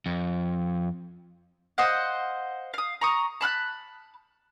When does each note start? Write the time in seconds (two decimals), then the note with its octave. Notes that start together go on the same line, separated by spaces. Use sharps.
0.06 F2
1.78 C5 D#5 F5 F#5
2.74 F5 D#6
3.01 A#5 C#6 D#6
3.41 A5 B5 F6 F#6